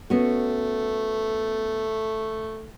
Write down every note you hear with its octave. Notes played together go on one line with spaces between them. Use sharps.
A3 B3 C#4 F#4